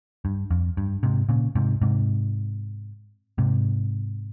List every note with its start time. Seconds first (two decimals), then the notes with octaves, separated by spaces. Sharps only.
0.25 G2
0.51 F2
0.77 G2
1.03 G#2 C3
1.29 A#2 C#3
1.55 G#2 C3
1.82 G#2 C3
3.38 G#2 C3